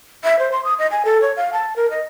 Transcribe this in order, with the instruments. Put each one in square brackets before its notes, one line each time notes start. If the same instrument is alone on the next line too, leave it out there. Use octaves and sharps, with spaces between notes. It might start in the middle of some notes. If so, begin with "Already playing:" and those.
[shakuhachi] E5
C5
C6
D#6
D#5
G#5
A4
C#5
F5
A5
A#4
D#5